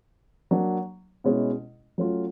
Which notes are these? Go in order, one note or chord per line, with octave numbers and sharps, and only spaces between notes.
F#3 A#3 D4
B2 G#3 C#4 E4
F#3 A3 C#4 F4